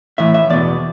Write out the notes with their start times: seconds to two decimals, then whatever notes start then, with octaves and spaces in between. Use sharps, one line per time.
0.18 A2 E3 E5
0.34 E5
0.50 E2 B2 D5